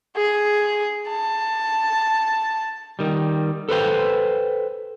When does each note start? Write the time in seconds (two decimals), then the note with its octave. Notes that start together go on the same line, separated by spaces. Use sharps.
0.17 G#4
1.09 A5
2.99 D#3 G3
3.69 A4 B4 C5 G5